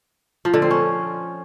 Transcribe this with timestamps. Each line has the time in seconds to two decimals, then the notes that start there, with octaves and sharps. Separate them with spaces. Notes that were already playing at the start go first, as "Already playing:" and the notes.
0.45 F3
0.54 D3
0.62 C4
0.71 C#4